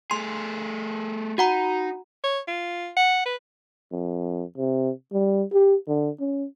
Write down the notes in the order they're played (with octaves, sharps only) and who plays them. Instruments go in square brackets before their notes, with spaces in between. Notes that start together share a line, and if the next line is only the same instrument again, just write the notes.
[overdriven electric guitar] A3 G#4 [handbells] C6
[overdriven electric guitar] D#4 [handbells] F#4 F#5 A#5
[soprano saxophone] C#5
F4
F#5
B4
[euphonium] F2
C3
G3
G4
D3
C#4